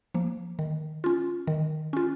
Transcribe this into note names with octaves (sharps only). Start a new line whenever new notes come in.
F3 A#3
D#3
C#4 F4
D#3
C#4 F4